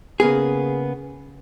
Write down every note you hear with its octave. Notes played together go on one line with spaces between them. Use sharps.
C#3 A#3 B3 G#4